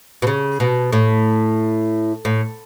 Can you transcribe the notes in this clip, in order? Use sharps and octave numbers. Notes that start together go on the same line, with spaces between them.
B2
C#3
B2
A2
A2